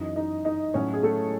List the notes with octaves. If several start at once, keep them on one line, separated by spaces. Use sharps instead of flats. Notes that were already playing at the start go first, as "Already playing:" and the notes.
Already playing: F#2 E3 D#4 D#5
D#4 D#5
D#4 D#5
A2 F#3 C#4 C#5
G#4
A3 A4